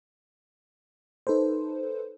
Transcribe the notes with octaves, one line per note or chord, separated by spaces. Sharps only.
D#4 A4 B4 C5